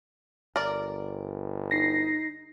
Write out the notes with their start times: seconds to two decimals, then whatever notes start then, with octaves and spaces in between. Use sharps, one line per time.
0.56 G1 A#4 D5
1.71 D#4 A#6 C7